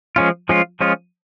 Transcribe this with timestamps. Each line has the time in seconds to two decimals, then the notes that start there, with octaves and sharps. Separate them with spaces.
0.16 F3 G#3 C#4 F4
0.49 F3 G#3 C#4 F4
0.81 F3 G#3 C#4 F4